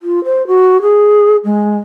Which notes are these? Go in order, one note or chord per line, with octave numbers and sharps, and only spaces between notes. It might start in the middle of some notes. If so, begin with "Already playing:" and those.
F4
C5
F#4
G#4
G#3